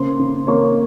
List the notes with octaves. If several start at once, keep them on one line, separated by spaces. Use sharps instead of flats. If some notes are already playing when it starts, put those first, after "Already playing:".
Already playing: C#3 A#3 C5 C6
C#3
A#3 C#5 C#6